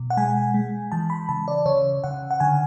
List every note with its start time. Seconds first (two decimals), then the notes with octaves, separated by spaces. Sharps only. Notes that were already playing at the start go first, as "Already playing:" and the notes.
Already playing: B2
0.10 F#5
0.17 G#3 G#5
0.54 G#3
0.92 E3 A5
1.10 B5
1.29 C#3 A5
1.48 D5
1.66 C#3 C#5
2.04 C#3 F#5
2.31 F#5
2.40 D3 G#5